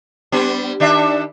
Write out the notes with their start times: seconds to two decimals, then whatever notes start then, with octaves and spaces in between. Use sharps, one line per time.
0.32 G3 B3 D4
0.80 D#3 D4 E5